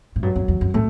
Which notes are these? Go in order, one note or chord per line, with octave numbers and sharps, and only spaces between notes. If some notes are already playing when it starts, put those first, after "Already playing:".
A2
G2 F#3
F#2
E2
F#2
A2 A3